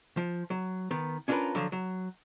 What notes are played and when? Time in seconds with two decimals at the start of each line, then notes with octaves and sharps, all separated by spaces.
0.17 F3
0.50 F#3
0.91 D#3 B3
1.28 C#4 D4 F4 G#4 A#4 B4
1.55 D3 F3 F#3
1.72 F#3